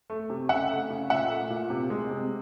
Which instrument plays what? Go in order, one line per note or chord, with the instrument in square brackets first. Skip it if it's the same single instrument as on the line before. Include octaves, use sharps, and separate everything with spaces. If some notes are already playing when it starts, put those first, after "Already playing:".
[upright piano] A3
C3
C#3 E5 F#5
A3
C#3
A#2 E5 F#5
A3
A#2
C3
G#3
C3